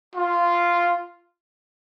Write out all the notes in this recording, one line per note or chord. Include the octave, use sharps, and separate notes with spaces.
F4